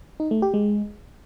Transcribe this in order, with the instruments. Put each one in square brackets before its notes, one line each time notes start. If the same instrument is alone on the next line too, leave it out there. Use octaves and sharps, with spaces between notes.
[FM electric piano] D#4
A3
G4
G#3